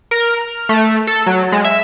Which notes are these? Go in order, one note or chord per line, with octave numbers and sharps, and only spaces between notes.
A#4
F6
A3
A4
F#3
G#3
E5